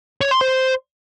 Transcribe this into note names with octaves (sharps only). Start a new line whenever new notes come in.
C#5
C6
C5